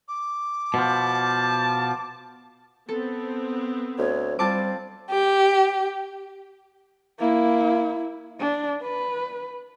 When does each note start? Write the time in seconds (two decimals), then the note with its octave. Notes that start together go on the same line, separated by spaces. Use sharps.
0.08 D6
0.74 B2 F3 A5
2.89 B3 C4 A4
3.98 D2 C#5
4.39 G3 C4 F4 A5 D6
5.10 G4
7.19 A#3 E4
8.40 D4
8.82 B4